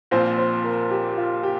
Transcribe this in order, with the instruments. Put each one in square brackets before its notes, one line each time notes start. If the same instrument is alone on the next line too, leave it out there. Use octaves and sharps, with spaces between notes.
[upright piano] A#1 A#2 F3 C4 F4 [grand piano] C5
[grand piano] C5
A#4
G4
F4
G4